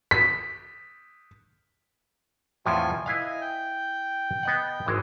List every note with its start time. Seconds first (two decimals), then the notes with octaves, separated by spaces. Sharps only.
0.11 B6
2.66 E2 A2 F3 C4 F4 G#5
3.06 E4 B4 D#5 F5 G#5
3.41 G5
4.43 B3 D#5 F#5
4.86 G#1 E3 G#3